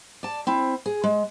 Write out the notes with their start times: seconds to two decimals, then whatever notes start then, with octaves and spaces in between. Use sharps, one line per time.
0.23 D5 A5
0.47 C4 E4
0.86 G#4
1.04 G#3